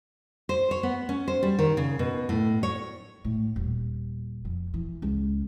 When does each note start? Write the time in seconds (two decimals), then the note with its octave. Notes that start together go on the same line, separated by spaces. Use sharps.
0.49 C5
0.71 C#5
0.83 B3
1.09 C#4
1.28 C5
1.43 G3
1.59 D#3
1.77 C#3
1.99 B2
2.29 A2
2.63 C#5
3.24 A2
3.56 D#1
4.45 F2
4.74 E3
5.02 C#2